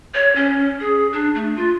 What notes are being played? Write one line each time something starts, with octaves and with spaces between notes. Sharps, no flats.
C#5
C#4
G#4
D4
A3
F4